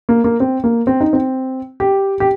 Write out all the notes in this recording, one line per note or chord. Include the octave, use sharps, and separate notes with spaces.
A#3
A#3
C4
A#3
C4
D#4
C4
G4
G4